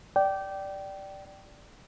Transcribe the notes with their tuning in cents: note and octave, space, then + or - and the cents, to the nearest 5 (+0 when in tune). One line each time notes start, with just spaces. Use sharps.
D5 +0 G5 -20